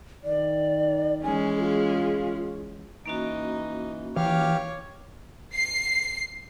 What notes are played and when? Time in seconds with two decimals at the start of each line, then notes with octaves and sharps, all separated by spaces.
0.24 D#3 D5
1.23 E3 G#3 C#4 G#5
1.58 F4 G#4
3.06 E3 A#3 C#4 D#4 F#4
4.16 E3 G4 C#5 F5 D6 F6
5.54 C7